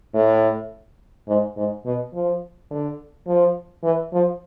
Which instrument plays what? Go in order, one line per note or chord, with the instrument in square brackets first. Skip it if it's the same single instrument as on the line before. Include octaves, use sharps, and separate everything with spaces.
[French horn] A2
G#2
G#2
B2
F3
D3
F3
E3
F3